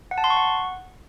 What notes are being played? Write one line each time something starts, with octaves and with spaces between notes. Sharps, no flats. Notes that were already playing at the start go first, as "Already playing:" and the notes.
F#5
A5
C6
C#6
F#5